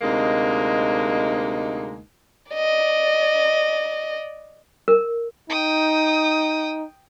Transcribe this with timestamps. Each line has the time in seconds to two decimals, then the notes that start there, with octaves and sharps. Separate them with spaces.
0.01 D2 C3 G#3 A#3 D#4
2.52 D5 D#5
4.88 A#4
5.49 D#4 G5 D#6